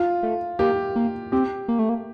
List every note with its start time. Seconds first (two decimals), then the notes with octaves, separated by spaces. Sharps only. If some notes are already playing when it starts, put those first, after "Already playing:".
Already playing: F4
0.23 A3
0.59 A#3 G4
0.96 A#3
1.32 C4 G4
1.68 A#3
1.79 A3
1.89 A#3